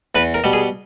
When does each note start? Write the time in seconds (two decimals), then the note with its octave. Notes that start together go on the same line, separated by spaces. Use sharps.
0.15 E2 B4
0.34 A#4
0.44 B2 G3
0.53 G#4